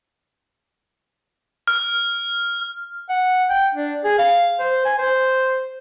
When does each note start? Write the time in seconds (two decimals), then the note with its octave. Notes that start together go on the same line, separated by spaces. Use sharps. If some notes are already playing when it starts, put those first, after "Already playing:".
1.67 F6
3.09 F#5
3.50 G5
3.74 D4
4.04 G#4
4.18 F5
4.60 C5
4.85 G#5
4.98 C5